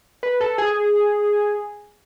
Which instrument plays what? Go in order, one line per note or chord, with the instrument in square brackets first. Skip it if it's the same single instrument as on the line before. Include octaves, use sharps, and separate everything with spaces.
[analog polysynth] B4
A4
G#4